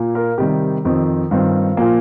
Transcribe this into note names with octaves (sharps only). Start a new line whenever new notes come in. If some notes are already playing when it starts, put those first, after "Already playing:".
Already playing: A#2 A#3
F4 A#4
C3 D#3 G3 G4
F2 D#3 C4
G2 D#3 C4 F4
A#2 F3 A#3